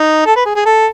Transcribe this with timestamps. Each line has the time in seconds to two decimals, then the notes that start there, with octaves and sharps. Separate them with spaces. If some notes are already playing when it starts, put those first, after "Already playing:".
Already playing: D#4
0.26 A4
0.36 B4
0.45 G#4
0.56 G#4
0.66 A4